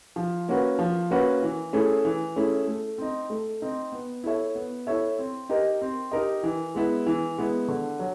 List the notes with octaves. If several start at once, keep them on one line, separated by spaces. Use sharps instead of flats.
F3
A#3 C#4 F#4 B4
F3
A#3 C#4 F#4 B4
E3
A3 C#4 E4 G#4
E3
A3 C#4 E4 G#4
A3
C4 D#4
A3
C4 D#4
B3
E4 A4 C#5 E5
B3
E4 A4 C#5 E5
C4
D#4 G4 A#4 D#5
C4
D#4 G4 A#4 D#5
E3
G#3 B3 E4
E3
G#3 B3 E4
D3
F#3